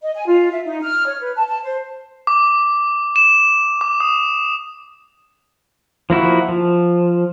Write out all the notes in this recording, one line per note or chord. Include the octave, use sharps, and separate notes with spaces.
D#5
G#5
F4
E5
D#4
F6
C#5
B4
A5
A5
C5
D6
E7
D6
D#6
F3 A#3 E4 F#4
F3